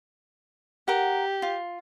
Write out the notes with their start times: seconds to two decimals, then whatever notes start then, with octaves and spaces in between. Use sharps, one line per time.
0.88 G4 A#4 F#5
1.42 F4